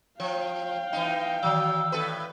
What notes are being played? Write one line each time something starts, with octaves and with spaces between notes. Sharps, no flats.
F3 C#5 F5 G5
E3 D#4
D#3 E3 F#3 D5 E6
A2 A4 B4